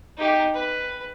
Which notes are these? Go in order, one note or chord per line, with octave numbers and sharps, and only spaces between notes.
D#4 G4
B4